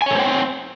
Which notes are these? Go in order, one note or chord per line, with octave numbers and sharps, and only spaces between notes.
A4 C5 C#5 G5 G#5